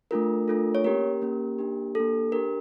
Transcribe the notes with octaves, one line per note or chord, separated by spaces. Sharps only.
A3 D4 F4 A4 A#4
A3 D4 F4 A4
C#5
A#3 C#4 G4 A#4
A#3 C#4 G4
A#3 D4 G4
A#3 D4 G4 A4
D4 G4 A#4